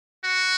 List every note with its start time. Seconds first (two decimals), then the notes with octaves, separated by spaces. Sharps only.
0.24 F#4